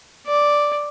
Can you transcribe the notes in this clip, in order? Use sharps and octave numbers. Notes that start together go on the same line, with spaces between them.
D5